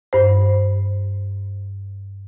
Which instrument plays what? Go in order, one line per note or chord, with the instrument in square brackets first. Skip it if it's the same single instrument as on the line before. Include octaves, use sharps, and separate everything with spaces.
[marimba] G2 C5